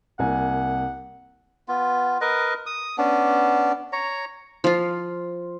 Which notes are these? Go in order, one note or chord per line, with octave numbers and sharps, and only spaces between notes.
C2 A#3 F#5 G#5
B3 F4
A#4 B4 D#5
D#6
B3 C#4 D4
C#5 A#5
F3 F4